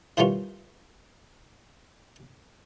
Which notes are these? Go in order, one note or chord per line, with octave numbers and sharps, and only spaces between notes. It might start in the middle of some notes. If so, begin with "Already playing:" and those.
A2 D#3 E3 G3 C#4 F4